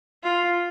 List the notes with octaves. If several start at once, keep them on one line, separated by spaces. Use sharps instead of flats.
F4